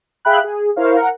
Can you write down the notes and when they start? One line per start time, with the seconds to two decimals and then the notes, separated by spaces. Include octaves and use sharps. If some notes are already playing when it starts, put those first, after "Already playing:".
0.25 G#4 E5 F5 G5 B5 F#6
0.44 G#4
0.76 E4 A#4 C5 C#5 F5
0.96 A#4 F#5